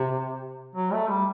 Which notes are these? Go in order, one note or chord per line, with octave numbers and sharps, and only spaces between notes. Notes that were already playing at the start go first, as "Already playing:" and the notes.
Already playing: C3
F#3
A3
G3